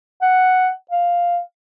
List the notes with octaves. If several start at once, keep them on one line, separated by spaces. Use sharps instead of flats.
F#5
F5